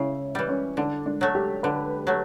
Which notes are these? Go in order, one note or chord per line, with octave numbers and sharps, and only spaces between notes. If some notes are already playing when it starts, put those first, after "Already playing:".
Already playing: C#3 E4
E3 G3
C#4
D3 D4
D4
F#3 A3
G4
D3 B4
F#3 A3